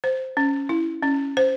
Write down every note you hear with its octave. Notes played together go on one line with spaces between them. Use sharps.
C5
C#4
E4
C#4
C5